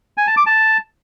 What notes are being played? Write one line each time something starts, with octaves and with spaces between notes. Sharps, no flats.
G#5
A5
D6
A5